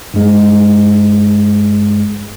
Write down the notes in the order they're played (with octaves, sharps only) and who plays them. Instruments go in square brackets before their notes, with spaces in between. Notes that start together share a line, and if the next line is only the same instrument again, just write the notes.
[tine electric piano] G2 G#3